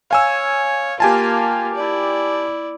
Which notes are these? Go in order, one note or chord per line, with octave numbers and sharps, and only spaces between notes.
C#5 F5 G#5 E6
A#3 F4 G4 G#5 A5
E4 D5